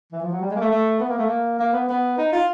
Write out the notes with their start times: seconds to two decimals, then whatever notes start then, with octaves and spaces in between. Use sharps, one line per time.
0.12 E3
0.22 F3
0.32 F#3
0.41 G3
0.50 G#3
0.56 A#3
0.60 A3
0.71 A3
1.00 B3
1.09 A#3
1.18 A3
1.27 A#3
1.59 A#3
1.73 B3
1.88 B3
2.18 D#4
2.33 F4